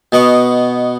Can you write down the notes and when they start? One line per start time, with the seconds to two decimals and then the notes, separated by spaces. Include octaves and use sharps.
0.12 B2 B3 D#5 C#6